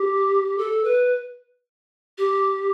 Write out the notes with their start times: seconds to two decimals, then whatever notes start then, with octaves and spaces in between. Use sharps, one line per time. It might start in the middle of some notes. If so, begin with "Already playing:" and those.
Already playing: G4
0.58 A4
0.84 B4
2.18 G4